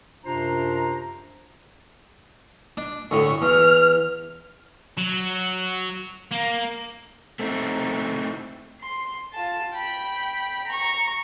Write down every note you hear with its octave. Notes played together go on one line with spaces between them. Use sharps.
F#2 C3 D4 F4 C5 A#5
D4
D2 A2 C#6
E2 F6
F#3
A#3
A3 C4 D#4 E4
C6
F4 A5
G5 B5
A#5 C#6